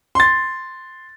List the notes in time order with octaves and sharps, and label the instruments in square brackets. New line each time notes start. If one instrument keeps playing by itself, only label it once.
[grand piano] C6 A6